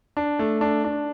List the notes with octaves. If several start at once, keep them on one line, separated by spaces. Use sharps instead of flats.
D4
A3
D4
D4